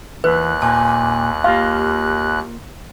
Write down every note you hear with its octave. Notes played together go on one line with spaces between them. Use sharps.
D#2 E3 B4 F#6
A#2 G#5 A5
A#3 F4 G4 F5